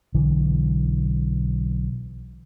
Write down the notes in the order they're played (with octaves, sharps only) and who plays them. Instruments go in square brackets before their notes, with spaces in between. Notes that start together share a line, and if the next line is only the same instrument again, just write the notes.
[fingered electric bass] B1 D3 E3